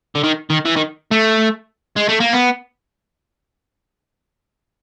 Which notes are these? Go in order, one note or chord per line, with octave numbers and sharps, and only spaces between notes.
D3
D#3
D#3
E3
D#3
A3
G#3
A3
A#3
B3